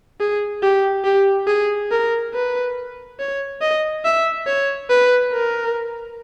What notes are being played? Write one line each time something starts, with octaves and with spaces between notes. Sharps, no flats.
G#4
G4
G4
G#4
A#4
B4
C#5
D#5
E5
C#5
B4
A#4